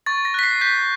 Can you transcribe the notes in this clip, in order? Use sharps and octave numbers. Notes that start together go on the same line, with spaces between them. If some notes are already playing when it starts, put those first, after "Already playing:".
C#6 A6
A#6
F#6 B6
C7
G6 B6